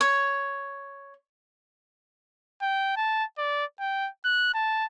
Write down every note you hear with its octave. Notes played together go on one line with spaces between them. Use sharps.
C#5
G5
A5
D5
G5
F#6
A5